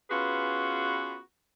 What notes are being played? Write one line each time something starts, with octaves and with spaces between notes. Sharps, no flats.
B3 C#4 F4 F#4 G#4 B4